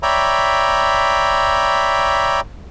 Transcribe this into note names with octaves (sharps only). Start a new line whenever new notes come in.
C#5 D5 E5 G5 A#5 B5